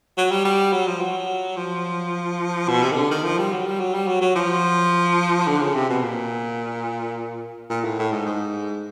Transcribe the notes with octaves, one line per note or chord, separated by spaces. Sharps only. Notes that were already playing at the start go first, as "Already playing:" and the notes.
F#3
G3
G3
F#3
F3
F#3
F3
B2
C3
D#3
D3
D#3
F3
G3
F#3
G3
F#3
G3
F#3
F#3
F3
D3
C#3
C3
B2
A#2
A#2
A2
A2
G#2
G#2